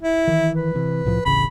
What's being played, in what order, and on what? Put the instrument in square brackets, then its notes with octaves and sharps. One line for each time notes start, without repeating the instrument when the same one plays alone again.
[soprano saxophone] E4
[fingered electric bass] D#3 E3
[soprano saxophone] B4
[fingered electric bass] C3 E3
C2 A2 F3
[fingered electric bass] D1 A1 C#3 [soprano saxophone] B5